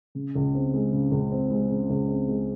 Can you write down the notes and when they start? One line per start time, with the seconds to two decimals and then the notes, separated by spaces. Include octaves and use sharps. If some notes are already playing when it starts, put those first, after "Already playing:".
0.15 C#3
0.35 C#2
0.55 C4
0.74 G#3
0.93 C#3
1.12 C#2
1.32 C4
1.51 G#3
1.71 C#3
1.90 C#2
2.08 C4
2.29 G#3